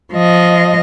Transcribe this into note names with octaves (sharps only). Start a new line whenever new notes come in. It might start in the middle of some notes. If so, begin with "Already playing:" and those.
F3 D#5